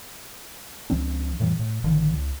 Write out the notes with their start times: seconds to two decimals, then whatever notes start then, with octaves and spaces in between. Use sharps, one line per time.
0.90 C#2 F3 C4 D4
1.40 F2 A2 E3 G3
1.59 A2
1.84 A1 D3 D#3 F3
2.13 C#2